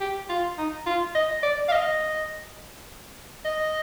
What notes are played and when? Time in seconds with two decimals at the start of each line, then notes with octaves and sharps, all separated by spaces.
0.01 G4
0.29 F4
0.58 D#4
0.86 F4
1.15 D#5
1.43 D5
1.68 F5
1.72 D#5
3.45 D#5